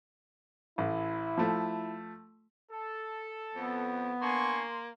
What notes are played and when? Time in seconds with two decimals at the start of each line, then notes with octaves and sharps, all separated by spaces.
0.78 A1 E4
1.38 F3 A3
2.70 A4
3.55 F2 B3
4.21 A#3 D4 G#5 C6 C#6